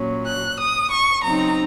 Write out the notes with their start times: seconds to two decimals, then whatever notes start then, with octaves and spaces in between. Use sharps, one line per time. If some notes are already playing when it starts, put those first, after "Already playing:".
Already playing: A#2 F#3 C#4
0.25 F#6
0.58 D#6
0.90 C#6
1.23 C#3 F#3 C4 D#4 A#5